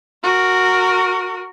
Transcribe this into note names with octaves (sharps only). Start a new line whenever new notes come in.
F#4 A#4